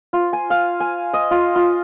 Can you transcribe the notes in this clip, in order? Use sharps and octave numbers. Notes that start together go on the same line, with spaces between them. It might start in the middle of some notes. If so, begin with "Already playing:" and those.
F4
G#5
F5
G#5
D#5
F4
F4